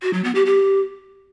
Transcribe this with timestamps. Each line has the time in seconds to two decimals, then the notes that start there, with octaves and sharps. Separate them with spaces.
0.03 F#4
0.13 F#3
0.24 B3
0.35 G4
0.46 G4